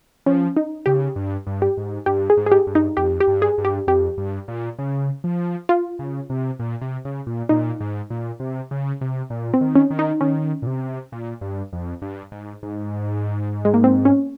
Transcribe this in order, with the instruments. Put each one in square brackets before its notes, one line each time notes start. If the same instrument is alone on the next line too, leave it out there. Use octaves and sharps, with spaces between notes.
[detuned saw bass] F3 [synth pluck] C#4
[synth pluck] D#4
[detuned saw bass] C#3 [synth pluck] G4
[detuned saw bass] G2
G2
[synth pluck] G4
[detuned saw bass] G#2
[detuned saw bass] G2 [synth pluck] G4
[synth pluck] G#4
[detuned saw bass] G#2
[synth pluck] G#4
G4
[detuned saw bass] G2
[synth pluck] D#4
[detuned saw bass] F2 [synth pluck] G4
[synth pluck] G4
[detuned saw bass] G2
[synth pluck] G#4
[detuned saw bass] G2
[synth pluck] G4
[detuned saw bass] F2 [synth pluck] G4
[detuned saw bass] G2
A#2
C#3
F3
[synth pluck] F4
[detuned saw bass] C#3
C3
A#2
C3
C#3
A#2
[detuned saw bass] A#2 [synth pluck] D#4
[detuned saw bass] G#2
A#2
C3
C#3
C3
A#2
[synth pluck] C4
[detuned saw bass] D#3
[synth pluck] C#4
[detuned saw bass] D#3
[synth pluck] D#4
[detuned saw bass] D#3 [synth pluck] C#4
[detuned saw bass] A#2
C3
A#2
G2
F2
G2
G#2
G#2
[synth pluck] G#3
A#3
C4
C#4